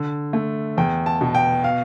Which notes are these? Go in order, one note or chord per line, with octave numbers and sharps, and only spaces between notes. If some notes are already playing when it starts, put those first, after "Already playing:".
Already playing: D3
A3
E2 G5
A5
B2
G5
F5